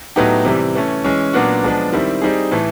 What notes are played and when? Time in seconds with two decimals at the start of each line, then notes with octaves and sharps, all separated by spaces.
0.16 A2 F#3 B3 D#4 G4
0.45 C3 E3 G3
0.75 E3 A3 C#4
1.04 E3 G#3 C#4
1.33 A#2 F#3 B3 D4 F#4
1.64 F3 G#3 B3 D4
1.93 D#3 G3 C4 E4
2.22 G3 C4 D#4 G#4
2.52 A2 E3 A3